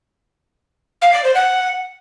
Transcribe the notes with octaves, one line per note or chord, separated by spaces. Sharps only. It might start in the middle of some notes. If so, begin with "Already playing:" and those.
F5
D5
C5
F#5